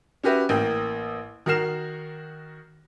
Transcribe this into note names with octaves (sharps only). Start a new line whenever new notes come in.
C#4 F#4 G4 B4 E5
A1 A#3 G5
D#3 F#4 A#4 F6 C7 E7